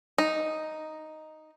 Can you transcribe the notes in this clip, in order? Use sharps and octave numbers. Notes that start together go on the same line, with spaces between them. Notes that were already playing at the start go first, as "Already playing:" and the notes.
D#4